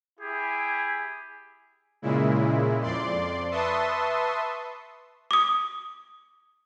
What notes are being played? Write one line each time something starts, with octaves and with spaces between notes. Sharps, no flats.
E4 G4 G#4
A#2 C#3 G#3 E4
F2 D5 C6
B4 E5 A5 C6 C#6 D#6
D6 D#6